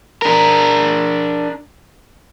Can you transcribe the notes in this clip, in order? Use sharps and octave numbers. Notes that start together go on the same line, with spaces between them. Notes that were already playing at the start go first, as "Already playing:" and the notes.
D4 A#4